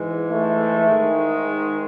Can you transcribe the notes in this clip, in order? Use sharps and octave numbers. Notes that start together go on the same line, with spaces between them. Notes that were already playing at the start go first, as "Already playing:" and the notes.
Already playing: G#2 E3 G#3
A3
G#2 D#3 G#3